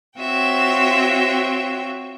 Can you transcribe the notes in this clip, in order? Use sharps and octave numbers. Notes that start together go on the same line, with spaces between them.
C4 F4 F#4 C#5 E5 G5